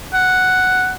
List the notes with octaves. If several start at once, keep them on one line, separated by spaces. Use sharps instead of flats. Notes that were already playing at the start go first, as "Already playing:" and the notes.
F#5